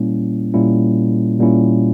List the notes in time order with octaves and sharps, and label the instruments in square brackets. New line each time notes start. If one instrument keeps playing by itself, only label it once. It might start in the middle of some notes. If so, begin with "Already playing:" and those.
Already playing: [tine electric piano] A#2 G3 A#3 C#4 E4
A#2 G3 A#3 C#4 E4
A#2 G3 A#3 C#4 E4